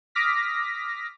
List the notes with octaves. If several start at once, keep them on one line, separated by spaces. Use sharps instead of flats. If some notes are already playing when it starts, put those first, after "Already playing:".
D6 D#6 F6 A#6 B6